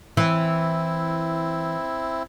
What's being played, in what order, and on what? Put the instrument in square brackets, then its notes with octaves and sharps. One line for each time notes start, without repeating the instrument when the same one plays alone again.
[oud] E3 [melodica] C4 E4